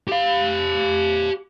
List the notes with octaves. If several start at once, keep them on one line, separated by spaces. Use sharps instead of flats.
G4 F5